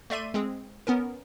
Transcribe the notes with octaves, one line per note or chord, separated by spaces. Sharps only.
A3 D5 E5 C6 D#7
G#3 C4 G#4
B3 C#4 A#4